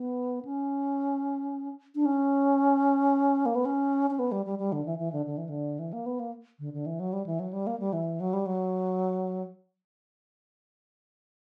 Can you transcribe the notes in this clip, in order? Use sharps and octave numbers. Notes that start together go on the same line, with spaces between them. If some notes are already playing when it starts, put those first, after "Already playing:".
Already playing: B3
C#4
D4
C#4
A#3
B3
C#4
C#4
B3
G3
G3
G3
D3
E3
E3
D3
D3
E3
D3
E3
A#3
B3
A#3
D3
D3
E3
F#3
G3
E3
F#3
G3
A#3
G3
E3
F#3
G3
F#3